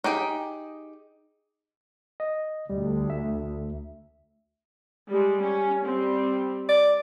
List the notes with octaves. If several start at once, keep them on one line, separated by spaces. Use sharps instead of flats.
D#4 G4 G#4 G5
D#5
D2 G3
E5
G3 G#3
C#4
G3 C4
D5